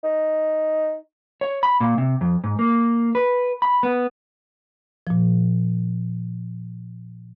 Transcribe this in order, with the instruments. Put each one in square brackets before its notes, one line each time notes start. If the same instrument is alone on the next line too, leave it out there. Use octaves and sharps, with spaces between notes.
[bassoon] D#4
[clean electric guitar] C#5
B5
A#2
C3
F2
G#2
A#3
B4
B5
B3
[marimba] A#2 F3